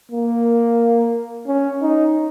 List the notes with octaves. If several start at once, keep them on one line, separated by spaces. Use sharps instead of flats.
A#3
C#4
D#4